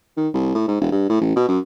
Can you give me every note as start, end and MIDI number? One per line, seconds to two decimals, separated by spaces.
0.17 0.28 51
0.34 0.54 36
0.55 0.65 45
0.68 0.77 44
0.80 0.91 28
0.92 1.09 43
1.10 1.20 45
1.21 1.34 33
1.36 1.47 47
1.48 1.59 42